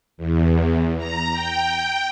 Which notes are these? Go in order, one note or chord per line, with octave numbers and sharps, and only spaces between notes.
E2
A#5
G5